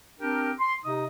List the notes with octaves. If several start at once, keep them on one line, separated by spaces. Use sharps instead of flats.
C4 D4 G4 A#4
C6
C3 D#4 D#5 D#6